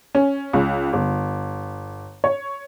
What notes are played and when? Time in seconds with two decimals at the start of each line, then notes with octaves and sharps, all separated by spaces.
0.15 C#4
0.53 C#2
0.93 G1
2.24 C#5